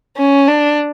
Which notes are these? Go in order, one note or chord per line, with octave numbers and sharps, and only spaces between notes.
C#4
D4